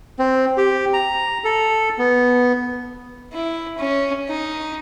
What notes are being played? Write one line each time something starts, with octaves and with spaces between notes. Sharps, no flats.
C4
G4
A#5
A4
B3
E4
C#4
D#4